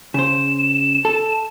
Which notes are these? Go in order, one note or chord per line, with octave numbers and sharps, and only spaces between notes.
C#3 C5 E7
A4